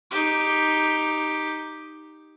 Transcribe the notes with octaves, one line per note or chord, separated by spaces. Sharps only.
D#4 G4